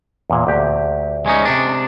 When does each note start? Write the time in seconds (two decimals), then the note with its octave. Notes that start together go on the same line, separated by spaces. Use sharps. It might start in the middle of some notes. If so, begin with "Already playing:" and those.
0.30 E2 A#2
0.47 D2 G4
1.26 G#3 C#4 D#4
1.45 C3 D4